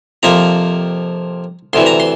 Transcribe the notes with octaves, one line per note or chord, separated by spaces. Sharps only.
F2 C3 F3 A#3 A#5
D2 C3 E3 C6
A#5
C6